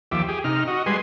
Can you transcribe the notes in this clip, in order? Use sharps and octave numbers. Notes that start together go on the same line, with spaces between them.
D#2 F3 G4 E5 D6
G4 G#4
C3 D#4 F6
F#4 D#5
G3 G#3 B4 G#5 C6